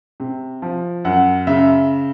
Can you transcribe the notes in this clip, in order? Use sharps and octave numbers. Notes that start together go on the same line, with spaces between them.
C3
F3
F#2 F#5
C#3 E5